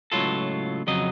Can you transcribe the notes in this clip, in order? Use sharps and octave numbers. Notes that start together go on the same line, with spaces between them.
C#2 A2 F#3 F4 A4
F2 C#3 F#3 D#5